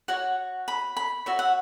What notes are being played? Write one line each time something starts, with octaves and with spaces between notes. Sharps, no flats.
F#4 C#5 F#5
B5
B5
F#4 C#5 E5
F#5